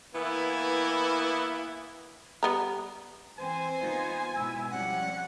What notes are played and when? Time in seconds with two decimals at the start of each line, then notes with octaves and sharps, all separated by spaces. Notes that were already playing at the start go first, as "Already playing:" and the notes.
0.14 E3 A#3 B3 E4
2.43 G3 B3 A#5
3.38 E3 C4 C5 G#5
3.80 B3 D#4 F4
4.36 G#2 B2 E4 E6
4.71 F3 G3 C#4 F#5